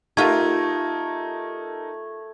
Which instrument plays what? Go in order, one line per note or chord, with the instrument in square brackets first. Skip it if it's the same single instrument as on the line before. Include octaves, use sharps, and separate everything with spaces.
[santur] A3 [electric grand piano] D#4 A#4 [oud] F4 G4 [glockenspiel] G#6